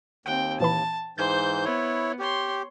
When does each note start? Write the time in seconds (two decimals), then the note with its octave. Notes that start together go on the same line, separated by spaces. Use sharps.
0.26 D#2 C4 F#5 G5
0.60 A#2 E3 A5 B5
1.18 G#2 E3 C5 G6 G#6
1.65 B3 E4 C#5
2.19 G4 C#5 C6